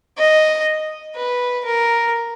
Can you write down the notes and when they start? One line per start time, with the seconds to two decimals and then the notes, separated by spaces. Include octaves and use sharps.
0.18 D#5
1.15 B4
1.65 A#4